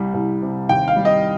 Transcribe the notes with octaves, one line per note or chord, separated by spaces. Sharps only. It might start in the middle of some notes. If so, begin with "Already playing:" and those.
Already playing: C2 G3
C2
C3
D#2 G5
F5
G3
D#5